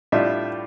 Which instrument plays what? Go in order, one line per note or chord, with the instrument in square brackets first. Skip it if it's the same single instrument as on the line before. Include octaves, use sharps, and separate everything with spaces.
[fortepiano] A2 G3 D4 F4 E5